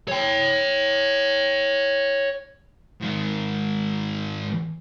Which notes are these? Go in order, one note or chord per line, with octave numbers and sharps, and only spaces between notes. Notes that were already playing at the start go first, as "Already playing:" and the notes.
C#5 G5
G#2 D#3